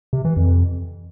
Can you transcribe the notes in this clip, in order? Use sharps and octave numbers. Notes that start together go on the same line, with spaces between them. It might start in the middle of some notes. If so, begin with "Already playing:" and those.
C3
E3
F2